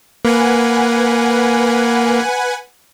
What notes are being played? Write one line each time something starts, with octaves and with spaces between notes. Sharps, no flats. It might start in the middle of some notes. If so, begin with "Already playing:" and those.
A#3 B4 F#5 G#5